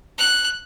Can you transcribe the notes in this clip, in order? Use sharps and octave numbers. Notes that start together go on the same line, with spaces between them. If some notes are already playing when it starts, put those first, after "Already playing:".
F#6